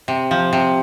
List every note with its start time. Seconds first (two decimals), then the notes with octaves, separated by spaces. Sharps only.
0.08 C3
0.31 F3
0.53 C3